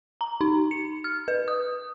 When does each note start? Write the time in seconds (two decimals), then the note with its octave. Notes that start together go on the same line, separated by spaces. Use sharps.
0.21 A#5
0.41 D#4
0.71 C#7
1.04 F6
1.28 B4
1.48 D#6